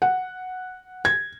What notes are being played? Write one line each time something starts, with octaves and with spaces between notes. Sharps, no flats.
F#5
G#6